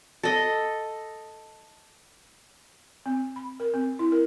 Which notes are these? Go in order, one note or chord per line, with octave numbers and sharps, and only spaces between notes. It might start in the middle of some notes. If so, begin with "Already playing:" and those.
A4 D#5
C4
B5
A#4
C4
E4
A#4